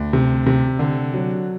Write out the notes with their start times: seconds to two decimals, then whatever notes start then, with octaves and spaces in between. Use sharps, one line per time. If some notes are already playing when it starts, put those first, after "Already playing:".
Already playing: D2
0.13 C3
0.46 C3
0.79 D3
1.13 F#3